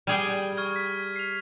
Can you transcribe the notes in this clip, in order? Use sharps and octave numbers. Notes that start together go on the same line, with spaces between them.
G3 G#4 G5
C#6 F6 G#6
B6
C7 F7